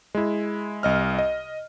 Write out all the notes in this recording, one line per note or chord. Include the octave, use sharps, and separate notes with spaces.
G#3 E4
C2 D#5 F6
D#5